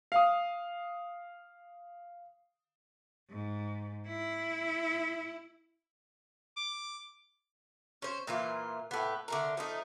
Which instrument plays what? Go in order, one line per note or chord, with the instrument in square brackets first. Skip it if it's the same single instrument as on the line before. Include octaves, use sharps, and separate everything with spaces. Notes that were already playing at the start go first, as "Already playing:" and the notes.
[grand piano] F5 D#6
[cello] G#2
E4
[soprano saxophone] D6
[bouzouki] C#4 C5
A#2 E3 F4
A2 B3
D3 A3 A#4
F3 A3 D#4